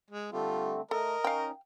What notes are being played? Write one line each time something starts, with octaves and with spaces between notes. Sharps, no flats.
G#3
D3 G3 A3 C4 F4
A3 A4 A#4 D#5
C#4 D#4 F5 G5